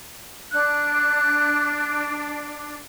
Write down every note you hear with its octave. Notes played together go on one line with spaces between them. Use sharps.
D4 F#6